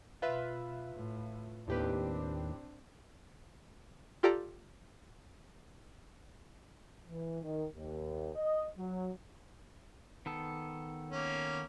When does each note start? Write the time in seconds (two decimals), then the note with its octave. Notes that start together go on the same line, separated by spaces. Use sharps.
0.22 B2 F4 B4 E5
0.93 A2
1.68 D#2 A2 C4 D4 G4 B4
4.23 F4 G4 A4 D5 A#5
7.08 E3
7.42 D#3
7.75 D#2
8.35 D#5
8.78 F#3
10.26 D#3 B3 A4
11.11 A#3 C#4